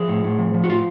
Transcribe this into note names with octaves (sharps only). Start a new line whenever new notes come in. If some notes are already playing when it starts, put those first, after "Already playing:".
Already playing: F3 G#4
A2
A2
F3
F3
F#4
A2 F4